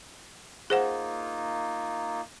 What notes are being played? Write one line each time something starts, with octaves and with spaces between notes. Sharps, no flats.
A#3 D#4 F4 G#4 C5 F#5